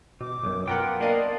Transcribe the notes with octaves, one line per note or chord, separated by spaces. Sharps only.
B2 D6
B1 F#2
B3 F4 A#4 F#5 G5
A#3 D4 D5 D#5 F5